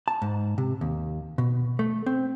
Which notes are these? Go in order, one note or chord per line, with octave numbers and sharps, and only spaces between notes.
A5
G#2
C3
D#2
B2
A3
C4